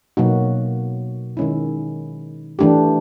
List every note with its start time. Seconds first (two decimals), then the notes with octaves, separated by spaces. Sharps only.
0.17 B2 F#3 A#3 D#4 F#4
1.37 D#3 G#3 C#4 E4
2.59 E3 A3 D4 G4